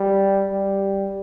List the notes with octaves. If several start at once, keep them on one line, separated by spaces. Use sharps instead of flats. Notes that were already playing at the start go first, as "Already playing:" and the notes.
Already playing: G3
G3